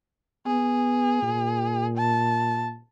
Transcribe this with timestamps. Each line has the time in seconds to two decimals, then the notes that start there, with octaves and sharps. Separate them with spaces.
0.46 B3 G#4
1.22 A#2
1.97 A5